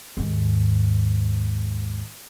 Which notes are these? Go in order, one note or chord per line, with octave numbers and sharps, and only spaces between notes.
D#2 G#2